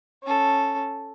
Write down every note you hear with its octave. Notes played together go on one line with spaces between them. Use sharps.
C#4 A4